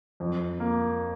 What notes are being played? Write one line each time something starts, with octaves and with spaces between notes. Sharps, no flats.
F2
A#3